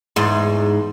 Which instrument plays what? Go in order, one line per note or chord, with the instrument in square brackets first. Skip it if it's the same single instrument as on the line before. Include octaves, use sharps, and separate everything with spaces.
[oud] E2 G#2